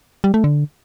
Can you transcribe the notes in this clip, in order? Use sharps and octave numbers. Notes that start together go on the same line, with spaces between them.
G3
A3
D3